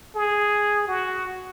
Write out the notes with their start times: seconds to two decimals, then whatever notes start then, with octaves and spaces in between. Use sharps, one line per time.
0.16 G#4
0.87 F#4